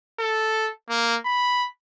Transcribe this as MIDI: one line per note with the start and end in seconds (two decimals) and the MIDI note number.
0.19 0.70 69
0.89 1.17 58
1.25 1.67 83